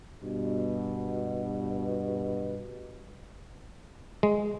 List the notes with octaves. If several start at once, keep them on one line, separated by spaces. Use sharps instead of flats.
G2 B2
G#3